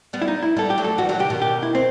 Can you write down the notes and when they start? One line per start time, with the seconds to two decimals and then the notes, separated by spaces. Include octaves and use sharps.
0.13 G3 B3
0.22 E4
0.28 D#4
0.43 E4
0.56 G3 B3 A4
0.70 G4
0.78 F#3 A3
0.84 A4
0.98 E3 G3 F#4
1.09 D#3 F#3 F#4
1.19 C3 E3 G4
1.30 B2 D#3
1.42 G4
1.63 E4
1.75 C4